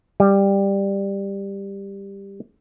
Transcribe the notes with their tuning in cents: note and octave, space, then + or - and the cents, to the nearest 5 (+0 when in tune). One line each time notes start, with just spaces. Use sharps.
G3 +10